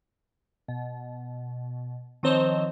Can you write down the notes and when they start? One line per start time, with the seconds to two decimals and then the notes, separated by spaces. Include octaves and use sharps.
0.68 B2
2.23 D#3 F3 C4 C5 C#5 D#5